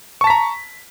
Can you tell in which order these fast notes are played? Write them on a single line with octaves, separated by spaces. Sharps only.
C#6 A5 B6 A#5